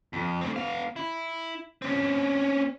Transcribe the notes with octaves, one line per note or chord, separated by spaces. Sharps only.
F2
A3 C4
B3 F5
E4
C4 C#4